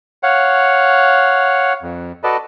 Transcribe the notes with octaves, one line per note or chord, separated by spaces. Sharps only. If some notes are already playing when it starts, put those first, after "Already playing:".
C#5 F5 F#5
F2
F#4 A4 B4 D5 D#5 A5